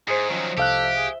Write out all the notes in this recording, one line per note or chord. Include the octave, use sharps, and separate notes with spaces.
G#2 E4 G#4 C5
D#3 F3 F#3 C#4 D#5
C2 G4 A4 F5 F#6
E5
G#4